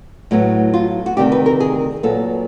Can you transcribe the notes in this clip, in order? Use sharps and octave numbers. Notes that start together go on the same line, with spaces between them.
A2 F#3 B3
F4
F#4
D2 C3 D#3 G3 G4
B4
A#4
G#4
A#2 F#3 B3 A4